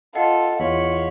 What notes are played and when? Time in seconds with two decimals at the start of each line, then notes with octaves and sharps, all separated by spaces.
0.15 F4 A4 D#5 F#5
0.60 E2 F4 C#5 B5